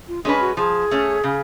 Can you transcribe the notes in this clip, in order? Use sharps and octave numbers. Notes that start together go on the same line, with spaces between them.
F4
G#3 C#4 D4 G#4 B4
F#4
F3 G#4
A3 C#4
C#3